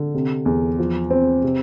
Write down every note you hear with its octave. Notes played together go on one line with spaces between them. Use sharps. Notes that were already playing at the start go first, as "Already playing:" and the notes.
Already playing: D3
C3
E2
F3
C4
C3